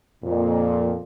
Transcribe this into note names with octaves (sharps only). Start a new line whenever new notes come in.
F2 A#2